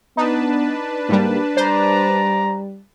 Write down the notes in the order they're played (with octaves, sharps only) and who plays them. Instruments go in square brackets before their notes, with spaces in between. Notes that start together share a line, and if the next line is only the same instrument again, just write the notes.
[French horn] B3 [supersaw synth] D4 B4 A5 [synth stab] D#4
[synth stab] G#2 G3 [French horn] A#3
[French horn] G3 [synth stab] C5 [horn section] D5 A#5